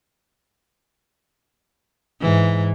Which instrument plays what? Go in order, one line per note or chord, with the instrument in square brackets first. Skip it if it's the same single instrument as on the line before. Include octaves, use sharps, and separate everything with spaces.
[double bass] G#2 [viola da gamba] E3